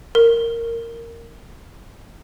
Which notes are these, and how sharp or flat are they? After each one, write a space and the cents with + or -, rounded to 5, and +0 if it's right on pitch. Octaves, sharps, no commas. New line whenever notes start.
A#4 -10